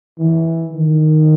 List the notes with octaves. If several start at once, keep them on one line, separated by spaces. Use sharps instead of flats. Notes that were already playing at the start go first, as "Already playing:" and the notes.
E3
D#3